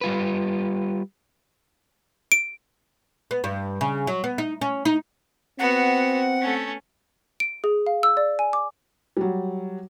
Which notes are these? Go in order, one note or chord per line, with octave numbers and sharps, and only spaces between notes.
G3 F4 B4
D7
B3
G2
C#3
F#3
B3
D#4
C#4
D#4
B3 C4 F#4 F#5
A3 C#4
D7
G#4
F5
E6
D5
G#5
D6
F#3 G3